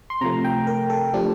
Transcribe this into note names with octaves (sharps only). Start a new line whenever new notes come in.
C6
C3 F3 A3 A#5
G5
A#4
A4
F3 A3 D4 G4